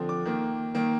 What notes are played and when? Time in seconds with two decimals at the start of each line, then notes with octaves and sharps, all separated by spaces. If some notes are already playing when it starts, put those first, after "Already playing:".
Already playing: D3 F3 C4
0.09 D6
0.25 D#3 A#3
0.75 D#3 A#3